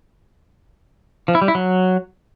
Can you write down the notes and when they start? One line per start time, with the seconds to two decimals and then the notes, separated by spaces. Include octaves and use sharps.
1.28 F3
1.35 E4
1.42 G3
1.48 E4
1.55 F#3